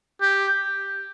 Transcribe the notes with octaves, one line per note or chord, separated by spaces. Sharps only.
G4